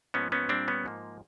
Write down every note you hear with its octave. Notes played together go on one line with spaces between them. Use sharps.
G#2 F3 A#3 B3 C#4
B3 C#4
A#2 G3 A#3 C4 D4
B3 C#4
G#2 F3 A#3